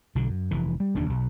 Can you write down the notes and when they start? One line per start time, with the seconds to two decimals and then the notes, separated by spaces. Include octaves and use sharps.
0.15 B1 D3
0.29 F#2
0.51 F1 E3
0.80 G3
0.94 E1 D#2 C#3 D4
1.09 B1